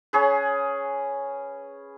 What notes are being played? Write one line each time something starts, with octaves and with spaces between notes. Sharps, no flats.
C#4 G#4 B4